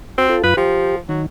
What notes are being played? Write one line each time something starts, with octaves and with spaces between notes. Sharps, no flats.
C4 F#4
F4 A4
F#2 F4 B4 B5
F3 G4
D#3 F#3